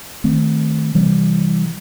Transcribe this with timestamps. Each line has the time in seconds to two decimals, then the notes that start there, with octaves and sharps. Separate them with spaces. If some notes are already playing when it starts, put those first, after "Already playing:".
0.24 D#3 A3 C4
0.94 C3 E3 G3